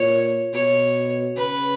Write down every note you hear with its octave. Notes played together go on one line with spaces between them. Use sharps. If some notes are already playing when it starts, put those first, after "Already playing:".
Already playing: A#2 C#5
B2 C#5
C#3 B4